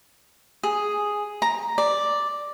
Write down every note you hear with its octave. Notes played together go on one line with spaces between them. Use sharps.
G#4
A#5
D5